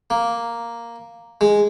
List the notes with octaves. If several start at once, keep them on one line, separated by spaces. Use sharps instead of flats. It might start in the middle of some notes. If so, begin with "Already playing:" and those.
A#3
G#3